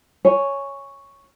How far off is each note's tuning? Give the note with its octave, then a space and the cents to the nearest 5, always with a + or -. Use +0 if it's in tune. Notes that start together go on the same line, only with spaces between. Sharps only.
C#5 +0 G#5 +0